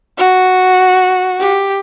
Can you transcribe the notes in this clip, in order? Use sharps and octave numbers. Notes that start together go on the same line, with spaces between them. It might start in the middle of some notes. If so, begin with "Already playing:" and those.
F#4
G4